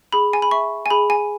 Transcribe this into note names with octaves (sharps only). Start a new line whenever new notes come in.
G#4 B5
G#5
B5
E5 C#6
G#5
G#4 B5
G#5